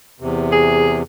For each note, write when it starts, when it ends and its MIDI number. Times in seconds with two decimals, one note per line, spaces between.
0.20 1.02 40
0.20 1.02 48
0.52 0.99 68